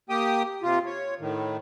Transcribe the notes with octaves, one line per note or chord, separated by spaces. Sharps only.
A#3 G4 G5 D#6
C3 F4
C#5
A2 D#3